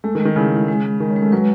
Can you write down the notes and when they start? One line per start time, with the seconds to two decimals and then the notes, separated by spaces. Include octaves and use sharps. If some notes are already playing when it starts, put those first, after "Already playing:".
0.04 G#3 A3
0.15 D#3
0.20 G#3
0.25 D#3
0.36 C#3 E4
0.52 G#3
0.68 G#3
0.84 G#3
1.00 D#3 G#3
1.11 C#4
1.16 G#3
1.22 A3
1.32 F#3 B4